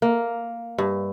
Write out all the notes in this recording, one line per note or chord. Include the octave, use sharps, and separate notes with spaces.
A#3
G2